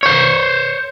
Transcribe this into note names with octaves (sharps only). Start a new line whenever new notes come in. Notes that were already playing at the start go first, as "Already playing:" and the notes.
C5 C#5